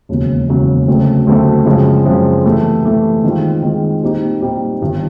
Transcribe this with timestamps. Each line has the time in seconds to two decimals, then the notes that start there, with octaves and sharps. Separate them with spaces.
0.09 E1 D#2 C#3 F#3
0.48 E1 D#2 C#3 F#3
0.87 D2 C#3 F#3 A3 C4
1.27 D2 C#3 F#3 A3 C4
1.66 F#2 C#3 F3 G#3 C4
2.05 F#2 C#3 F3 G#3 C4
2.45 C3 E3 A3
2.84 C3 E3 A3
3.23 D#3 G#3 C4 F4
3.63 D#3 G#3 C4 F4
4.03 A#2 G3 C4 D#4 G4
4.41 A#2 G3 C4 D#4 G4
4.81 G1 G2 D#3